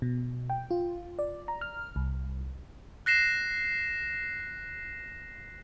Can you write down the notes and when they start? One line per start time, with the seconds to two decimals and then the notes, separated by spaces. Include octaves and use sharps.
0.02 B2
0.50 G5
0.71 F4
1.19 D5
1.48 A#5
1.61 F6
1.96 C2
3.06 F#6 A#6 C7 E7